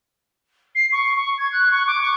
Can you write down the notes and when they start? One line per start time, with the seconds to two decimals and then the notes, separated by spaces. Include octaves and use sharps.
0.75 C7
0.92 C#6
1.16 C#6
1.38 G#6
1.52 F#6
1.71 C#6
1.87 D6
2.01 C#6